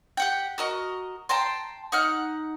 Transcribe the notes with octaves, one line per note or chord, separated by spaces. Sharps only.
G4 F#5 G5
F#4 A#4 D#5
G5 A5 A#5 C6
D#4 F#5 F6